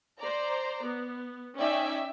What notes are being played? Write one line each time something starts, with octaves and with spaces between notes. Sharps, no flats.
C5 D5 A#5
B3
C#4 D#4 D5 E5 G5 G#5